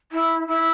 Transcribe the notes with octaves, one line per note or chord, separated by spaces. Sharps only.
E4
E4